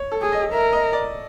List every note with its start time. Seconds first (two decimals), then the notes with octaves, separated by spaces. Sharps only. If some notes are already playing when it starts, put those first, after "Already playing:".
Already playing: C#5
0.12 A4
0.22 G#4
0.32 D#5
0.52 A#4 E5
0.73 D#5
0.93 D5